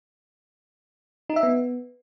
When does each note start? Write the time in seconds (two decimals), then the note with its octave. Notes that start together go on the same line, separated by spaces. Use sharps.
1.29 D#4
1.36 E5
1.43 B3